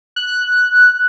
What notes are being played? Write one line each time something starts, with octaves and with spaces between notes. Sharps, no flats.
F#6